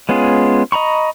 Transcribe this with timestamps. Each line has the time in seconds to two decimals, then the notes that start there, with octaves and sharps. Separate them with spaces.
0.09 G#3 B3 C#4 F4 G#4
0.72 D#5 A#5 B5 C#6